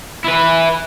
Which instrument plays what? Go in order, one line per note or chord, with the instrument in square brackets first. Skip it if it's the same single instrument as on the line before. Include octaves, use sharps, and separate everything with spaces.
[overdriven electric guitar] E4 B4